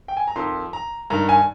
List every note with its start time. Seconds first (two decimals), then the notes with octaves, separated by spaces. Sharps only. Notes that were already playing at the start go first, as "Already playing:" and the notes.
0.08 G5
0.17 G#5
0.27 A#5
0.36 F2 D#3 C6
0.73 A#5
1.10 G2 D#3 A#5
1.29 G#5